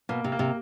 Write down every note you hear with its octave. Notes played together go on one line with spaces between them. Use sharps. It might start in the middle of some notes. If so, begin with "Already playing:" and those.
B2 A#3
C3
A#3
C3